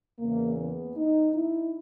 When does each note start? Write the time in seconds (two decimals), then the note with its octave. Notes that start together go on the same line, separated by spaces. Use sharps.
0.19 E2 C#3 E3 A#3
0.58 B3
0.97 D#4
1.36 E4